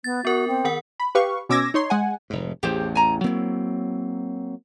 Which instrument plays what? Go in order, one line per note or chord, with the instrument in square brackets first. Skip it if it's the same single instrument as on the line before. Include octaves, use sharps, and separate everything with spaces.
[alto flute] B3 [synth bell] A6
[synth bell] B3 A#4 [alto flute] F#4
[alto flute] C4
[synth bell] D#3 A#4 F#5
[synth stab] B5
G4 B4 F5 C#6
B2 C#4 D6 E6 G#6 A#6
D#4 C#5 C6
G#3 F#5 G#5
[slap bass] F1 G#2
[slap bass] A1 E2 [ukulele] G4 G#4 C5
[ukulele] G#5 A#5
[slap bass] F#3 A#3 C4 [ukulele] E4 C#5